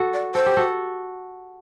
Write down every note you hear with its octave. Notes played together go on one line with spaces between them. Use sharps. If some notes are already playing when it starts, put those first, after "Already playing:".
Already playing: F#4 A4
D5
A4 C5
G4
F#4 A4